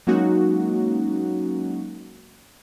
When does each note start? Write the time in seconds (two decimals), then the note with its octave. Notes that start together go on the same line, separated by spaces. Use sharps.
0.07 F#3 G#3 A#3 C#4 D#4 F#4